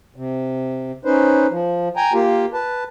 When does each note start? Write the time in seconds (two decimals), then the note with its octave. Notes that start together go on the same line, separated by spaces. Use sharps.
0.16 C3
1.05 C#4 D#4 B4 C5
1.51 F3
1.97 G5 G#5 A#5
2.13 A#3 F4 G4
2.53 B4 A5